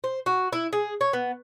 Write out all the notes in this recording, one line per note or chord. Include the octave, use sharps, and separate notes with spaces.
C5
F#4
E4
G#4
C#5
B3